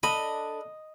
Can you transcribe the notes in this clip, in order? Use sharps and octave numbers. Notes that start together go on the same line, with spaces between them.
D4 A4 D#5 B5